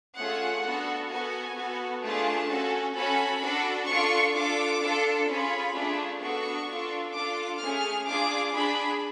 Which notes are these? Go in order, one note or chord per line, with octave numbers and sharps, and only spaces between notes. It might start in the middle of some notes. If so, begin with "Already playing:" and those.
A3 C#4 F4 G#4 F#5
B3 D4 F#4 A4
B3 F#4 A4 G#5
B3 F#4 A4
A3 D4 F4 G#4 A5
C#4 F#4 A4
C#4 F#4 A4 B5
D4 F#4 A4
D4 F4 A4 C#6
D4 F4 A4 D6
D4 F4 A4
C#4 F4 G#4 B5
A3 D4 F4 G#4
B3 D4 F#4 A4 C#6
D4 F4 A4
D4 F4 A4 D6
A3 C#4 G#4 F6
D4 F4 G#4 D6
D4 G#4 B5